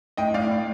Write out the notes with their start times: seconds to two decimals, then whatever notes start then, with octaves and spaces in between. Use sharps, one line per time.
0.17 A2 D#5 G5
0.34 A2 D5 F5
0.51 A2